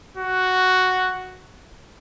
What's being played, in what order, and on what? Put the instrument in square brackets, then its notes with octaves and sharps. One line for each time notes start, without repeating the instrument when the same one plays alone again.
[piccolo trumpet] F#4